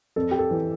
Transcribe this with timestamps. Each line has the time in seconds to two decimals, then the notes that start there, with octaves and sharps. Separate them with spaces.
0.16 F2 A4
0.31 G4
0.39 A4
0.51 E3